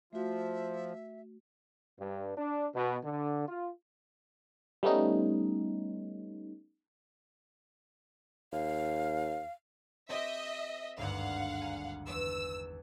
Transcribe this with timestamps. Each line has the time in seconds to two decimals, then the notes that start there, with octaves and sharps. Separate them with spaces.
0.13 F3 A3 F#4 E5
1.99 G2
2.37 D4
2.74 B2
3.04 D3
3.47 F4
4.83 G3 A3 B3 C#4 D#4
8.52 D#2 F5
10.09 C4 G4 D#5 E5
10.98 G#1 D2 G2 F5 F#5
11.61 G#5 A#5
12.07 E2 E6